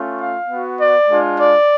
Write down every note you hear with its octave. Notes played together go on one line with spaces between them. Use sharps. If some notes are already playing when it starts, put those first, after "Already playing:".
Already playing: A3 C#4 F4
F5
B3 F#4
D5
G#3 D4 F4
D5